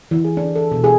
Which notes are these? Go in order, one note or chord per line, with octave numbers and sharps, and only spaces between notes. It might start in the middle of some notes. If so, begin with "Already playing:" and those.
E3
G#4
D4
A4
B2
G#4